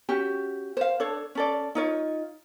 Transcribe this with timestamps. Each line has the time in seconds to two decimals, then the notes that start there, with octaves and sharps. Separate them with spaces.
0.09 C#4 F#4 G4
0.77 C5 F5
1.00 D4 A4 C#5
1.35 C#4 A4 D5
1.75 D#4 F4 C#5